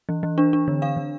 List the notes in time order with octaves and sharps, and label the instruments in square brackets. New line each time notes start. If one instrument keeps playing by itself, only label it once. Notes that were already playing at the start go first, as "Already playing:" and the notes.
[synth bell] E3
E3
D4
D4
D3
D4 F5
D3